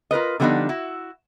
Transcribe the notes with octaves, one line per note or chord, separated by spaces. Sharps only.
F4 A#4 B4 D#5
D3 F3 G3 B3 D4 D#4
E4 F#4